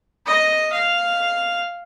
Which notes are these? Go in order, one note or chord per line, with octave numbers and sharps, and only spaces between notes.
D#5
F5